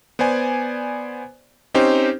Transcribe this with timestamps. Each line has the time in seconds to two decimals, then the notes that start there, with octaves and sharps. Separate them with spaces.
0.19 B3 C5 D5 G#5
1.74 C4 C#4 D#4 G4 C5